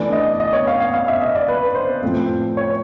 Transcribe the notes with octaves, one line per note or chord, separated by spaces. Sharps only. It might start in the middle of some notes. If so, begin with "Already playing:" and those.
Already playing: E3 A3 D4 D5
D#5
D#5
C#5
F5
F5
F5
E5
D#5
D5
B4
C5
A2 F3 A3 C4
C#5